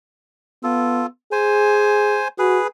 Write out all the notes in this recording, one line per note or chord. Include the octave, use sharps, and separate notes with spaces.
B3 F4 A4
G#4 C5 G#5
F#4 G#4 B4